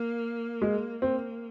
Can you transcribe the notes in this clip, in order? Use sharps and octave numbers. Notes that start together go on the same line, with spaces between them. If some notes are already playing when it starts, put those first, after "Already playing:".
Already playing: A#3
G#3
A#3 C4